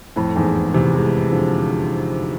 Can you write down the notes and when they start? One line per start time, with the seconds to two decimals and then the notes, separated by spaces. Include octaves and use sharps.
0.16 F2 A2
0.36 E2 G#2
0.74 C3 E3
0.94 E3 G#3
1.32 D3 F3